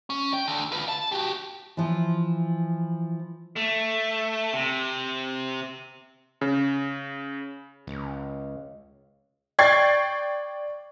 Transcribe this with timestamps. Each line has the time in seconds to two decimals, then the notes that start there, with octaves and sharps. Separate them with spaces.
0.10 C#4
0.34 G5
0.48 D2 D3
0.72 F4 B4
0.89 A5
1.12 F#4 G4
1.77 E3 F3
3.56 A3
4.53 C3
6.41 C#3
7.87 C#2
9.59 D5 G5 C#6 G#6 A6 C7